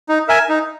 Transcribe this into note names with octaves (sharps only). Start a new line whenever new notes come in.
D#4
A#4 E5 G#5
D#4